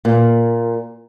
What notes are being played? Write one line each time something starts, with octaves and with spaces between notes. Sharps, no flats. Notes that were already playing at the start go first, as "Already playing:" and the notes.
A#2